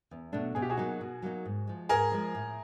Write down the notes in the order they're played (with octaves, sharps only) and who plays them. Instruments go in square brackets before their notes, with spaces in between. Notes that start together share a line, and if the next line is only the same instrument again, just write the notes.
[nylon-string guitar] E2
B2 F#3 A3 D4
[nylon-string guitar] B2 [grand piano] G#4
[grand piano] G4
F#4 G#4
[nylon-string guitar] F#3 A#3 D#4
B2
F#3 A#3 D#4
G#2
F3 G#3
[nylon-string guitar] G#2 [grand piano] G#4 A#4
[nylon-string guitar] F3 G#3
A2